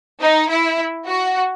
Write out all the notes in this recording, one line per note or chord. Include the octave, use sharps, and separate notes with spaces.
D#4
E4
F#4